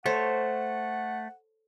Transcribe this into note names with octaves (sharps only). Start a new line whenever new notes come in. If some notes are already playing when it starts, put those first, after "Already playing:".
A3 A4 C5 C#5 F#5